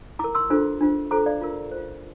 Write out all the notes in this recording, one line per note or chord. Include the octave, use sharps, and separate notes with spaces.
E4 A#4 A#5 D6
C6 E6
D4 F4 A4 C5
D4 F4 C5
F4 A4 C5 A#5 D6
D5 F5
F4 A#4
F4 C5